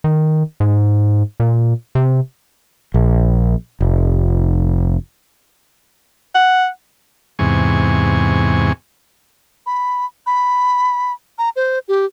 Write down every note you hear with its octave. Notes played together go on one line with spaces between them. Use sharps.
D#3
G#2
A#2
C3
A#1
F1
F#5
E2 G#2 C3 G#5 C#6
B5
B5
A#5
C5
G4